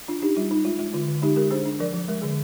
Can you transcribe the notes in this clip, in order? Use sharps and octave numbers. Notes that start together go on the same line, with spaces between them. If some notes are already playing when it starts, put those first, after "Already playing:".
D4 F4
D4 D#4 G4
G3 F4
D#4
G#3 F4
G#3 F4
D3 F4
D3
G#3 D#4 G4
G#3 G4 A#4
D4 G#4 C5
D4
F3 A#4 D5
F3
G#3 A#4
D3 G#4